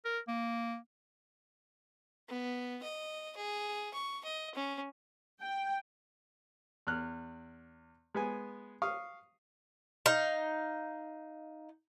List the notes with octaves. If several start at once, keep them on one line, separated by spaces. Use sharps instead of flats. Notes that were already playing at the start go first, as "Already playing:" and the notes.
A#4
A#3
B3
D#5
G#4
C#6
D#5
C#4
G5
E2 F6 F#6
G#3 B3 G#5
F5 C#6 D#6
D#4 F5